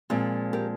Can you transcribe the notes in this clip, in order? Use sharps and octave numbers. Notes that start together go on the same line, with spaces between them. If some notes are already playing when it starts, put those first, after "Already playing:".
A#2 F3 G#3 C4
G4 A#4